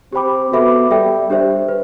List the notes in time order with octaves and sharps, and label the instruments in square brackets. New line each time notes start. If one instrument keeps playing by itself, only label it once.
[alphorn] C4 [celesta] G4 C5 G5 B5 D6
[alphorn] B3 [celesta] F#4 A4 E5 B5 D6
[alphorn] G3 [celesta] A4 E5 G5
[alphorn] G3 [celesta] D4 G4 C5 E5
[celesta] B4